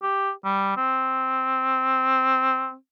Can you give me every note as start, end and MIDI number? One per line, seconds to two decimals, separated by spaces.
0.02 0.31 67
0.44 0.75 55
0.77 2.74 60